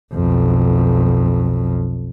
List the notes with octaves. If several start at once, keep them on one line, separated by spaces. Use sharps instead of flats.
B1 F2